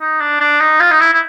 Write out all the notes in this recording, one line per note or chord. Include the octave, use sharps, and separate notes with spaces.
D#4
D4
D4
D#4
F4
D#4
E4
E4